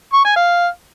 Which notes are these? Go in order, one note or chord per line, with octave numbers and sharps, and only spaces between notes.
C#6
G#5
F5